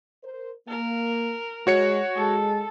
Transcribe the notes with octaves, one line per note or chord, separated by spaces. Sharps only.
A#4 C5
A#3 A#4
G#3 F#4 C#5 C#7
G#3 A4